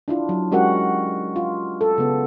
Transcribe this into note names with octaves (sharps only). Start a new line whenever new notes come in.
D4 E4 F4
F#3
G#3 C#4 F#4 G4 A#4 F#5
F4
A4
C#3 B3